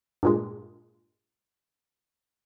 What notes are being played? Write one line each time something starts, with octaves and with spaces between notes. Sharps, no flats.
G2 A#2 G#3